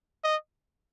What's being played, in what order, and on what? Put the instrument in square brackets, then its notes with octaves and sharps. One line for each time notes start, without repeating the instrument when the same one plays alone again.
[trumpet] D#5